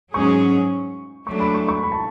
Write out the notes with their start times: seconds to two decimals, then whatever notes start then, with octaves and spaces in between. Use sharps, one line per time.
0.14 G#2 F#3 C#4 G#4 C#6
1.27 F#3 A3 D4 C#6
1.40 B5
1.54 C#6
1.69 C#6
1.83 B5
1.92 A5